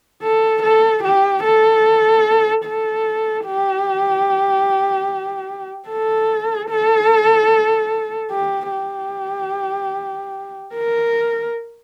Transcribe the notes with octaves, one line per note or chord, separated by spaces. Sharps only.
A4
A4
G4
A4
A4
G4
A4
A4
G4
G4
A#4